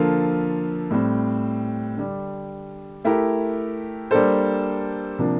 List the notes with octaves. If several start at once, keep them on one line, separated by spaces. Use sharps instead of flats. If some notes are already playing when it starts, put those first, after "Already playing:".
Already playing: D3 F3 A#3 F4 A4
A2 G3 C4
D3 G3 D4
A3 E4 G4 A#4
G3 A#3 D4 A4 C5
C3 F3 A#3 D4